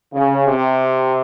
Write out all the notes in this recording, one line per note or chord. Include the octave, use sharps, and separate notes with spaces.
C#3
C3